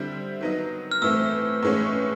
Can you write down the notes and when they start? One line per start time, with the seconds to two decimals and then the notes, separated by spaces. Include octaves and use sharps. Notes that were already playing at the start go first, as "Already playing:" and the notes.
Already playing: D3 G3 C4 E4
0.41 D#3 F#3 B3 D#4
0.91 F6
1.02 A2 E3 A3 C4 E6
1.63 A2 E3 G#3 C#4